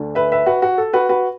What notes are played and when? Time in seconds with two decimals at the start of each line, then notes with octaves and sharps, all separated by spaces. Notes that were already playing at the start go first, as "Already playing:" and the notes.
Already playing: D2 D3 A3 D4
0.15 B4 E5
0.32 B4 E5
0.46 F#4 B4
0.62 F#4
0.78 A4
0.93 F#4 B4
1.09 F#4 B4